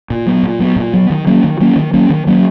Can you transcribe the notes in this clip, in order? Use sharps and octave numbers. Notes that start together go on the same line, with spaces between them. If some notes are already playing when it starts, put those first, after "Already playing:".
A#2
F#3 B3
A#2
F#3 B3
A#2
F#3 B3
D#3
F#3 A#3 C#4
D#3
F#3 A#3 C#4
D#3
F#3 A#3 C#4
D#3
F#3 A#3 C#4